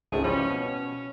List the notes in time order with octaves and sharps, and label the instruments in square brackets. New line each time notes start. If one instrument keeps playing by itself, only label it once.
[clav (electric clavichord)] G#1 C#2 A3 [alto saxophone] G#4
[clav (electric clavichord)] E3 F3 G3 [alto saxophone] C#4
[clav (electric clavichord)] B2
[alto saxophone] C#4